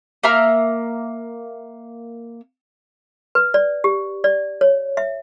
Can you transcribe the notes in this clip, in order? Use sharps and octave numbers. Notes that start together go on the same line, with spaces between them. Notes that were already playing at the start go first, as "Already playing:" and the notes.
A#3 E5 A#5 F6
B4
D5
G4
D5
C#5
E5